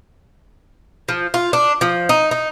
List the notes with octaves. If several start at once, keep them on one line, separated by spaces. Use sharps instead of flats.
F3
F4
D4
F3
D#4
D#4